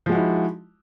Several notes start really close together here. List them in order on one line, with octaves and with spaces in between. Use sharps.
F3 G#3 F#4 E4 D#4